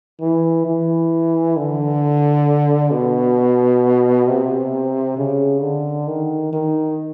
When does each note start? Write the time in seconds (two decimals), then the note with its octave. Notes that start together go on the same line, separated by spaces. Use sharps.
0.21 E3
0.66 E3
1.57 D3
2.91 B2
4.27 C3
5.18 C#3
5.62 D3
6.08 D#3
6.53 D#3